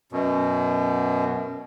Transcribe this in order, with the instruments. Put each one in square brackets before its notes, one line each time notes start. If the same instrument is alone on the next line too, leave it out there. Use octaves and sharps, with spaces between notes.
[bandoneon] F#2 B2